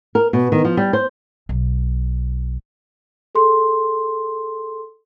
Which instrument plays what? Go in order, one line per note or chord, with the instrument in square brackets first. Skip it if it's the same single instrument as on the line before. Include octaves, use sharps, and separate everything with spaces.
[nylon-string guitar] A#4
B2
D#3
F3
G3
C5
[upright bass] B1
[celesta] G#4 A4 C6